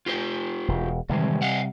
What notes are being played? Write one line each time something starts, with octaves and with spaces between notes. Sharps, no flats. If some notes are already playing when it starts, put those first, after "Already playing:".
F4 G4 C5
E1
C3 D#3 E3 G3 G#3
D#5 F5 F#5